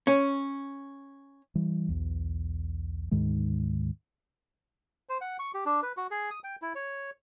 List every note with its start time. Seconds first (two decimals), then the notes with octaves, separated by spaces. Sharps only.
0.07 C#4
1.55 E3 G3
1.89 B1 E2
3.11 D2 G#2 D#3 G#3
5.09 C5
5.21 F#5
5.39 C#6
5.54 G4
5.65 D4
5.83 B4
5.97 F#4
6.11 G#4
6.31 D#6
6.44 G5
6.62 E4
6.75 C#5